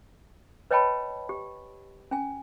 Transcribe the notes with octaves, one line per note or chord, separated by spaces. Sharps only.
B4 C#5 D#5 G5 A5 B5
G4
C#4 G#5